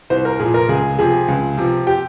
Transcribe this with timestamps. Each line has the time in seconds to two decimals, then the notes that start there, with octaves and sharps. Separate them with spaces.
0.10 C2 C5
0.25 A#4
0.40 A#2 F3 G#4
0.54 A#4
0.69 C#2 G#4
0.99 C3 F3 G#4
1.28 C#2
1.57 C3 F3
1.87 G4